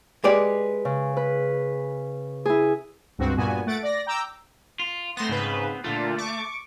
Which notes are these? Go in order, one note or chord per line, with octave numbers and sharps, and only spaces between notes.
G#3 G4 B4 D5
C#3
B4
E4 G#4
C#2 G2 C4 F#4
G2 A#2 B3 F#4 G#5
A3 F#5 A6 D7
D5 A#6
G5 A#5 D6 E6
F4
A3 B3 C4 C6 A#6
G#2 C#3 B4
A#2 D3 A3 F4
C#6 D6